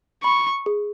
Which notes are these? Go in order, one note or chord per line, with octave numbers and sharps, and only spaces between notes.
B5 C#6
G#4